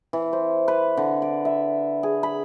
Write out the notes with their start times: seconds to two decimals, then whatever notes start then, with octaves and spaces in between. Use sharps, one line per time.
0.13 E3
0.33 C5
0.68 B4
0.97 D3
1.22 D5
1.45 E5
2.03 G#4
2.23 B5